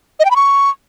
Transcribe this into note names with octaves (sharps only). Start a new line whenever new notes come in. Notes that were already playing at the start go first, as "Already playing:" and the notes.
D#5
G5
B5
C#6